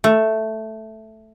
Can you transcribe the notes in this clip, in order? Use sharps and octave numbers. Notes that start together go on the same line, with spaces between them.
A3